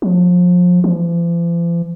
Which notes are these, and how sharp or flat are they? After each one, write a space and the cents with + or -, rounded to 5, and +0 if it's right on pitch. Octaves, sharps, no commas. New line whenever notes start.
F3 +30
F3 -45